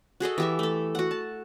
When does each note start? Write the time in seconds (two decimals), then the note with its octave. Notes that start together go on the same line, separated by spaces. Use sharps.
0.20 F#4 G#4 A4 D#5
0.38 E3 G4 E5
0.59 A3 A4
0.95 F#4 F#5
1.11 A5